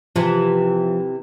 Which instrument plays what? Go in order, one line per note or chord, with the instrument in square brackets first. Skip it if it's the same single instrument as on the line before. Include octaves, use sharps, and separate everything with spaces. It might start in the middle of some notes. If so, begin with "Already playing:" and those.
[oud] C3 E3 [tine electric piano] F3